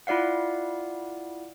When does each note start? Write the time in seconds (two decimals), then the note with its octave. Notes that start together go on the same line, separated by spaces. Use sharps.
0.07 E4 F4 D5 F5 F#5